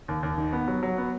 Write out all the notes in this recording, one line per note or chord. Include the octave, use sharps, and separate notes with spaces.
D#2
D#2
D#3
B3
F#3
F#3
B3